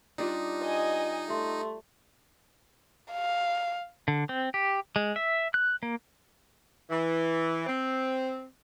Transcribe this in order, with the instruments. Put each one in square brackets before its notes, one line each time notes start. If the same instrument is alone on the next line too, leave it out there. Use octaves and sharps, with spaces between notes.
[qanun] G3 D4 F4 [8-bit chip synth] D#4 [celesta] G4 D#6
[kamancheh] D#5 G#5
[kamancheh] A3 [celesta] G4 E5 C6
[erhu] F5
[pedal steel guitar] D3
C4
G4
G#3
E5
F#6
A#3
[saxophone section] E3
C4